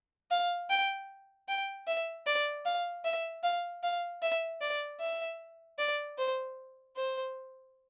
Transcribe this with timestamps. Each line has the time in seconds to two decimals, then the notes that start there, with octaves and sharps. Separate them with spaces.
0.31 F5
0.70 G5
1.48 G5
1.87 E5
2.26 D5
2.66 F5
3.05 E5
3.44 F5
3.83 F5
4.22 E5
4.61 D5
5.01 E5
5.79 D5
6.18 C5
6.96 C5